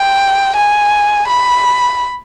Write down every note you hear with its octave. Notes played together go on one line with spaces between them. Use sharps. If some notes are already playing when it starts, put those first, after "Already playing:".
Already playing: G5
G#5
B5